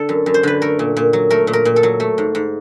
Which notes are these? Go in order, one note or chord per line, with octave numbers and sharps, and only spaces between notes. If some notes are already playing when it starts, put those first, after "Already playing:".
Already playing: D3 A4
F#2
F#2
C5
D3 B4
A3 A#4
A#2
A#2
F#3
A3 A#4
A#2
A#4
A#2
A4
F#3
A3
G#2
G#2